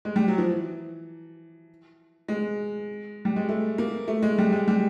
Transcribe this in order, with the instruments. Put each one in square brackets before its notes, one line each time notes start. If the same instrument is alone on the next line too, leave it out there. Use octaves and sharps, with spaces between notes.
[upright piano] G#3
G3
F#3
F3
E3
G#3
G3
G#3
A3
A#3
A3
G#3
G3
G#3
G3